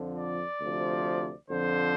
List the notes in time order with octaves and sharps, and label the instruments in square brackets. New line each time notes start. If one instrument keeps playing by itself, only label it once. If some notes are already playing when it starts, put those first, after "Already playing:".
Already playing: [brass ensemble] F2 D3 F3
D5
D2 C3 F3
F2 D3 F3 C5